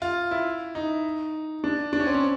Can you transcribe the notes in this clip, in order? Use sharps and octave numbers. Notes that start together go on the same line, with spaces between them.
F4
E4
D#4
D4
D4
C#4
C4
C#4